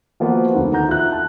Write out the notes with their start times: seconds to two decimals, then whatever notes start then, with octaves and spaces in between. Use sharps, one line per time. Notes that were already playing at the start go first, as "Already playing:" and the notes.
0.20 F3 A#3 B3 F4 F#4 B4
0.55 D2 D#3
0.73 F#5 A#5 G6
0.88 F4 E5 F#6
1.12 A5